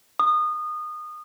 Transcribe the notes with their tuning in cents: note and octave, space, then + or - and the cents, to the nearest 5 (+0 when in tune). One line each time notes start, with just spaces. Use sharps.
D#6 -25